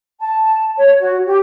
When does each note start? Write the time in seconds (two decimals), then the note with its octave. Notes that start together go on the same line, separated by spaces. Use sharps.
0.20 A5
0.77 C#5
1.00 F#4
1.26 G4